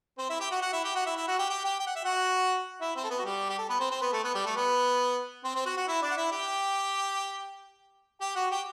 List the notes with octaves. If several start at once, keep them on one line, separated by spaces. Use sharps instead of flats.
C4 C5
E4 E5
G4 G5
F#4 F#5
F#4 F#5
E4 E5
G4 G5
F#4 F#5
E4 E5
E4 E5
F#4 F#5
G4 G5
G4 G5
G4 G5
G5
F#5
E5
F#4 F#5
E4 E5
C4 C5
A4
B3 B4
F#4
G3 G4
G4
A4
B3 B4
C4 C5
C4 C5
B3 B4
A3 A4
B3 B4
G3 G4
A3 A4
B3 B4
C4 C5
C4 C5
F#4 F#5
F#4 F#5
E4 E5
D4 D5
F#5
E4 E5
G4 G5
G4 G5
F#4 F#5
G4 G5